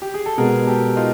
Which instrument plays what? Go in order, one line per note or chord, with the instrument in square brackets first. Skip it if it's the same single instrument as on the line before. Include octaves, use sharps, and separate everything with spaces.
[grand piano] G4
G#4
A4
[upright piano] B2 G#3 B3 [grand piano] G#4 A#4
[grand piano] G4 A4
D#4 F4